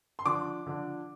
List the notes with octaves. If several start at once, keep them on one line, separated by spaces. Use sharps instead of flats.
C6
D3 F3 D4 D6
D3 F3 D4